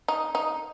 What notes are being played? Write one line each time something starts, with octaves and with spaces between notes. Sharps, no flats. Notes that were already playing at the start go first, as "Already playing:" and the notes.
D#4
D#4